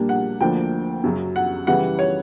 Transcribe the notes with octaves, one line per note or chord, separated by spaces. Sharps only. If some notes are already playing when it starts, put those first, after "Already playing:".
Already playing: A#2 G3 A#3 D4
F#5
D2 D3 F3 A#3 D4 G5
F#2 C#3 F#3
F#5
C#3 E3 G3 F#5
C#5